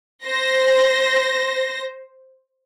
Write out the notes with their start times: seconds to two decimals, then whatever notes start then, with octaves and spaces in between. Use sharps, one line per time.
0.25 C5 A#6